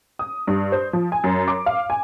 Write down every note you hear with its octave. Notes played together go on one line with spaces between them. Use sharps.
D#6
G2
C5
F3
G#5
F#2
D6
F5
G#5